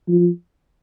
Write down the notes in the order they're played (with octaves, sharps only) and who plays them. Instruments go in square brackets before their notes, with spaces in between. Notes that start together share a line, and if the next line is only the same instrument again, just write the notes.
[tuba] F3